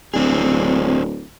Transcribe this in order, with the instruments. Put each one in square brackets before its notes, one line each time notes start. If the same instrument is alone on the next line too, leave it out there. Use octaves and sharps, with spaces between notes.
[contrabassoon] D1 [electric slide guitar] C4 D4 G#4